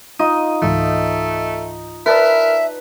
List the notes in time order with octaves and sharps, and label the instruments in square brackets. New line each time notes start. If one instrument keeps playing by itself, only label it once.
[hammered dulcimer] D#4 F4 D#5 [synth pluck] D#7
[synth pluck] C#2 G#2 E3 [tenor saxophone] A3
[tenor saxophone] A#4 [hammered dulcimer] B4 [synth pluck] D5 A5 B6 [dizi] E5